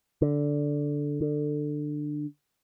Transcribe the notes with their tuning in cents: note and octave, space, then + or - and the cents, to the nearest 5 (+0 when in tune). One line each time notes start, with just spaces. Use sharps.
D3 -5
D3 +15